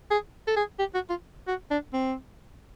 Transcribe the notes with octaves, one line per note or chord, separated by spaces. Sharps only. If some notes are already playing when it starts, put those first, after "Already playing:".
G#4
A4
G#4
G4
F#4
F4
F#4
D4
C4